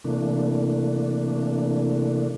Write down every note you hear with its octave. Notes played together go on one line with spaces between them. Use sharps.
C3 E3 A3 A#3 D4